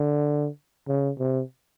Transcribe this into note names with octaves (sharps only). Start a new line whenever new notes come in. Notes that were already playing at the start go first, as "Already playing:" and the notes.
Already playing: D3
C#3
C3